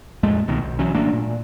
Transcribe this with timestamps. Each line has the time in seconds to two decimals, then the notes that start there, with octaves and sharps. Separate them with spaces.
0.23 F2 A#2 G#3 A3
0.48 C2 B2 D#3
0.62 B1
0.79 B1 E3 F#3 C#4
0.95 A1 A3 A#3 D4
1.13 A#2